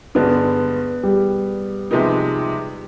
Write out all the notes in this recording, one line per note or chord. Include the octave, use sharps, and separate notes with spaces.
G2 D3 G#3 B3 D4
G3
C3 F3 G#3 B3 D#4